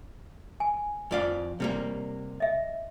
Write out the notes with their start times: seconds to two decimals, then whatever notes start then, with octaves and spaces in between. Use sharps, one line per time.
0.60 G#5
1.11 F2 D5 F5
1.60 C3 G3 A#3
2.40 D#5 E5